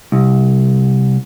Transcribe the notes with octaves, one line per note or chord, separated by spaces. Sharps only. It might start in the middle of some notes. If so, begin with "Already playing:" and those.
C2